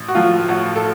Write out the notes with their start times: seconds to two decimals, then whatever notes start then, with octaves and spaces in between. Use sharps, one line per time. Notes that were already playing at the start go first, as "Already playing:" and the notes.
Already playing: A1
0.08 F#4
0.15 A2 F3 F4
0.49 A1 F#4
0.76 A4